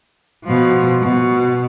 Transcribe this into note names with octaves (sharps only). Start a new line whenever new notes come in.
B2 F3
B2